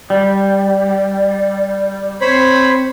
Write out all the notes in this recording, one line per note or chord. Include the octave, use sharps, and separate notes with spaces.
G3 D5
D5
C4 C5 C#5 B5